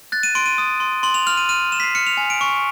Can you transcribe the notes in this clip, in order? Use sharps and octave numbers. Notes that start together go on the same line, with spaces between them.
F#6 A6
D#7
C6 D7
D#7
D#6
C6
C6 F#7
F7
F6 F7
D#7
F6 D#7
C6 E7
B6
C7
F6 C#7
F7
G#5
D7
C#6